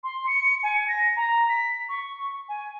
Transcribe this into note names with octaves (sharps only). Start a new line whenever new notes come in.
C6
C#7
G#5
A#6
A#5
B6
C#6
G#5